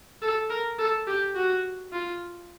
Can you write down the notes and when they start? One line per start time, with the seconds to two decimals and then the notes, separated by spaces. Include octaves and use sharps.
0.22 A4
0.50 A#4
0.79 A4
1.07 G4
1.35 F#4
1.93 F4